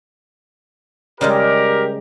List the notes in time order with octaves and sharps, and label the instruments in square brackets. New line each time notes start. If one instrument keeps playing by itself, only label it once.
[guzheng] C#3 G3 G#3 [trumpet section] G4 A#4